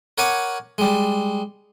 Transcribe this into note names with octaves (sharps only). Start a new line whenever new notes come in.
A#4 C#5 F#5 G#5 B5 D6
G3 G#3